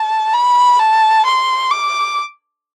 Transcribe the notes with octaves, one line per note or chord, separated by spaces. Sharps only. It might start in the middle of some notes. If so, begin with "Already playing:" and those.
Already playing: A5
B5
A5
C6
D6